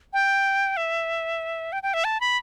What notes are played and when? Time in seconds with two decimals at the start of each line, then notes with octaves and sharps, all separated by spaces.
0.13 G5
0.77 E5
1.72 G5
1.83 G5
1.94 E5
2.04 A5
2.21 B5